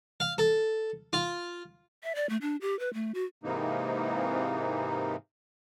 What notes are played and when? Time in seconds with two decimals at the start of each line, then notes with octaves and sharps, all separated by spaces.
0.20 F5
0.38 A4
1.13 F4
2.03 E5
2.15 D5
2.29 A3
2.42 D4
2.61 G4
2.79 B4
2.94 A3
3.14 F#4
3.43 G#2 C3 E3 A#3 D#4